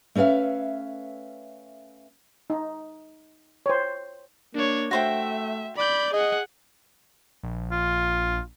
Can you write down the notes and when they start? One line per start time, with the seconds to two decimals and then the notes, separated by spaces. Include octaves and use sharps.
0.15 A3 C#4 B4 E5 F5
2.50 D#4
3.66 C5 C#5
4.55 A#3 D4 C#5
4.91 A3 F#4 C5 E5 G5
5.77 D5 B5 G6
6.13 G#4 D#5 F#5
7.43 A#1
7.71 F4